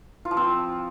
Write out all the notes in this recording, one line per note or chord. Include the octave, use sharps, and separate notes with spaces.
F4
F3
C4